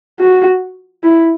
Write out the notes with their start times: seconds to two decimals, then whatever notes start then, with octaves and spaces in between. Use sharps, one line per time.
0.20 F#4
1.04 E4